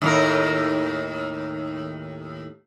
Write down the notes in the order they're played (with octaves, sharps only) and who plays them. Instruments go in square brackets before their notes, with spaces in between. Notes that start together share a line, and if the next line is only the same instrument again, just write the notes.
[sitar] D#2 A2 A#4